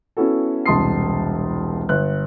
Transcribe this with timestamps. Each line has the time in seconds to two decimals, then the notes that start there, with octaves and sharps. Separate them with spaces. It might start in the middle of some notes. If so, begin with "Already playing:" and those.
0.17 B3 C#4 E4 F#4 A4
0.66 E1 C2 A5 C6 D#6 C7
1.89 G1 F#6